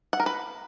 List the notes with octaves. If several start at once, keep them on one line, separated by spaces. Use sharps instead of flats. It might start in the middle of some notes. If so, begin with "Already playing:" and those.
F#5
A#4
B4